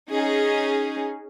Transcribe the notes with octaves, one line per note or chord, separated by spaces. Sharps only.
C#4 D#4 G#4